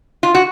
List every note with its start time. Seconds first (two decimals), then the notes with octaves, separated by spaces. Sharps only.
0.23 F4
0.35 F#4